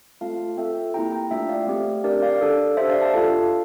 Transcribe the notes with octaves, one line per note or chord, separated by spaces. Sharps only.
A3 C4 F4 A4 F5 A5
C4 F4 A4 E5 G5
A#3 E4 G4 G5 A#5
G5 A#5
A3 D4 F4 E5 G5
D5 F5
A3 C4 G4
D4 G4 A#4 D5
D5 F5
D4 A4
D4 G4 C5 E5
D5 F5
F5 A5
D4 F4 A4 F5 A5